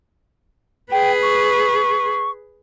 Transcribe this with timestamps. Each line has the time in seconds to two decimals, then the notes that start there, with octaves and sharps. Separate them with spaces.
0.92 G#4 B4 G5
1.22 C#6